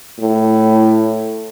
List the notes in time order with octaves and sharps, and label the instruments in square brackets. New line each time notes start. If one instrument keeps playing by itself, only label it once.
[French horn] A2